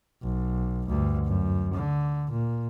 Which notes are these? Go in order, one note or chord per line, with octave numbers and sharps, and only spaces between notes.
B1
D2 G2
F#2
D3
A#2